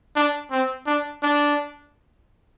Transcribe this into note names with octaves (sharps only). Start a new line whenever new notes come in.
D4
C4
D4
D4